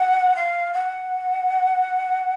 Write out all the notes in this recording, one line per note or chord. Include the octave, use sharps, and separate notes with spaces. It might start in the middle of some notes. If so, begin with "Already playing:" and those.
Already playing: F#5
F5
F#5